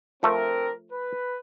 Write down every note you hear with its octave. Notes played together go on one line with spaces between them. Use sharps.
F3 A3 C4 D4 A#4
B4